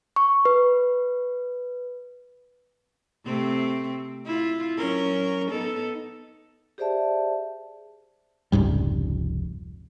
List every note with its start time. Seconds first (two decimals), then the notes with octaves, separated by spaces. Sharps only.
0.16 C#6
0.45 B4
3.25 C3 A3 C4
4.26 E4 F4
4.77 F#3 C#4 A#4
5.51 B3 D#4 A4
6.78 G4 G#4 C5 D5 E5 A5
8.52 F1 C#2 G#2 G3